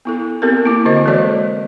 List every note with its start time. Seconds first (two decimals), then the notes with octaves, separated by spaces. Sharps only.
0.05 B3 E4 A4
0.42 B3 C4 G4 A4 A#4
0.64 A#3 E4 D6
0.85 D3 C4 F#4 A#4 C5 D#5
1.05 E3 G#3 F#4 A4 D5 D#5